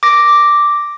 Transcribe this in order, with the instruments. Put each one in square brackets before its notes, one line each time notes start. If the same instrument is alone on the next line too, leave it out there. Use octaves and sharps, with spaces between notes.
[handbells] D6 A#6